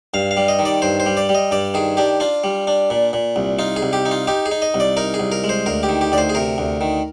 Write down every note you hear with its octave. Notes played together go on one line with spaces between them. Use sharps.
G2 F5
F5
G3
D#5
D#3
D5
G2 C5
C5
G3
D5
G3
D#5
G2 D5
D#3 G#4
D4 G4
D4 F4
G3
D4
A#2
A#2
C2
D#4 F4
G#4
C2
G4
D#4
F4
D#4 G4
G#4
D#4
D#5
C2
D5
D#4 A#4
G#4
C2
A#4
G#3
C5
D2 A#4
G4
D#3
G4
D2 D5
C5
G#4
C3 A#4
D2
D#3